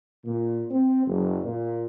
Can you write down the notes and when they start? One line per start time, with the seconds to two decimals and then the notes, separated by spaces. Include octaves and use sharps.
0.25 A#2
0.71 C4
1.05 F#1
1.44 A#2